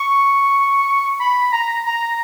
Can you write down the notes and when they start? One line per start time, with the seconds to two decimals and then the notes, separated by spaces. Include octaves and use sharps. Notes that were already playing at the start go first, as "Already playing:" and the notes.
Already playing: C#6
1.20 B5
1.52 A#5
1.86 A#5